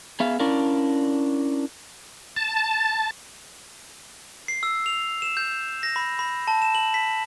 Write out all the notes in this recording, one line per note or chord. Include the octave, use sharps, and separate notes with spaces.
B3 G#4 E5 F5
C#4 D4 E4 A#4 D5 F5
A5
C7
E6
F7
E7
G6
A#6
B5
B5
A5
E7
F#7
B6